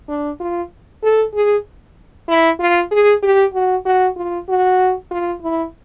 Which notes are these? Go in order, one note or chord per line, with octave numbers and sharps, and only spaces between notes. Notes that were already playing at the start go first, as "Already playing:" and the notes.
D4
F4
A4
G#4
E4
F4
G#4
G4
F#4
F#4
F4
F#4
F4
E4